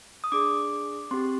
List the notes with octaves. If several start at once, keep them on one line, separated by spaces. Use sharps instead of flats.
D#6
D4 G#4 D6
C4 G4 C6